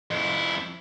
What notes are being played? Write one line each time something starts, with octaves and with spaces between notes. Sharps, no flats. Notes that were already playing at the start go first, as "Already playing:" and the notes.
F2 E4